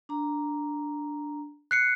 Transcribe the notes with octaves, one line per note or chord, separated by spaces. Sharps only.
D4 A#5
F#6 C7 C#7